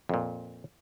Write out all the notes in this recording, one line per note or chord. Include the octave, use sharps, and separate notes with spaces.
F2 A#2